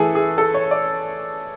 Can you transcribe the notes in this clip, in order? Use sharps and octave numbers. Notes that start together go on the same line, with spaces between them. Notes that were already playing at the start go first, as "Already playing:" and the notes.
Already playing: E3 A3 E4 G#4 A4
G#4
A4
C#5
D5